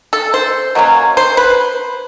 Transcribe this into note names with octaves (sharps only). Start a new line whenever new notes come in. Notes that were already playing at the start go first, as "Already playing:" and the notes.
A4
C5
B2 F#3 A#3 C#4
C5
B4